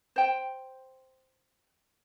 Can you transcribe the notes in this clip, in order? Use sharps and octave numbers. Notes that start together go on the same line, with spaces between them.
C5 G5